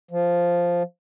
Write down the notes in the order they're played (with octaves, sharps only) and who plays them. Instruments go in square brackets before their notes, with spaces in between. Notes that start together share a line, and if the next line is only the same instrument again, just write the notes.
[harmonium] F3